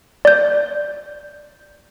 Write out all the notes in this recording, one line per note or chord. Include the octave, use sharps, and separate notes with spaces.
D5 G6